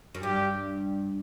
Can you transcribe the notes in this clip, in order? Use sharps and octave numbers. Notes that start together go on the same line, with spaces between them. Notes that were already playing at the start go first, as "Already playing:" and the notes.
F#2
G2 G4